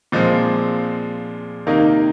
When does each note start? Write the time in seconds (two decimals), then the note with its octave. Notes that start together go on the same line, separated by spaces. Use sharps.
0.12 A#2 F3 G#3 C4
1.66 C3 D#3 A#3 D#4